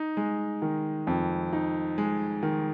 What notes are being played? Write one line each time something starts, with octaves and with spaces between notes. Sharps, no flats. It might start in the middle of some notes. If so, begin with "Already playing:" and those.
Already playing: D#4
G#3
D#3
F2
D#4
G#3
D#3